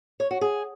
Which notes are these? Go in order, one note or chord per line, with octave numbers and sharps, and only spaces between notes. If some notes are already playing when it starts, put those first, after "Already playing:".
C#5
F#4
G#4